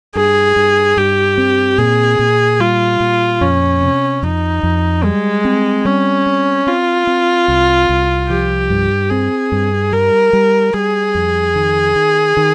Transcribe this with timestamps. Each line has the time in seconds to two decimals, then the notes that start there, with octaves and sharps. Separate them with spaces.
0.16 G2 G#4
0.56 G2
0.97 G2 G4
1.38 C4
1.78 A#2 G#4
2.19 A#2
2.60 G3 F4
3.00 A#2
3.41 F2 C#4
3.82 C3
4.23 F2 D#4
4.63 F2
5.04 G3 G#3
5.45 C4
5.85 G3 C#4
6.26 C4
6.67 C4 F4
7.07 C4
7.48 C2
7.89 C2
8.29 F3 G4
8.70 G2
9.10 C4 G#4
9.52 G2
9.92 G3 A#4
10.33 G3
10.74 G3 G#4
11.15 F2
11.55 D#3
11.96 D#3
12.37 D#3